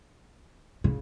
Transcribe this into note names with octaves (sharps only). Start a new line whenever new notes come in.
C#3